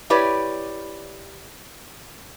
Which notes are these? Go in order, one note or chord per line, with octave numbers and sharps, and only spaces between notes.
E4 G4 B4 C#5 D5